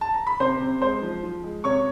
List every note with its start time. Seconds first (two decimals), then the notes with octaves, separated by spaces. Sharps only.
0.01 A5
0.14 A#5
0.27 B5
0.40 C3 C5 C6
0.60 C3
0.82 G#3 C5 C6
1.02 F3
1.24 F3
1.44 G#3
1.64 C3 C#5 C#6